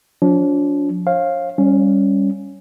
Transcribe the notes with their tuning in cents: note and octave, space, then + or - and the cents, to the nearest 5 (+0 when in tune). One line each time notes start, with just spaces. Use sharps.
F3 +40 D4 -35
C#5 -45 F5 +0
G3 +10 C#4 +0